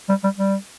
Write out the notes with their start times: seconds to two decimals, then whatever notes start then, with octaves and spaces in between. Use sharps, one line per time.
0.09 G3
0.24 G3
0.38 G3